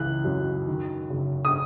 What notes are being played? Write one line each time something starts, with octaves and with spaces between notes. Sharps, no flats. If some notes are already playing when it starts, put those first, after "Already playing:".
Already playing: C#2 E3 F#6
F#2
D#3
F#1
D#6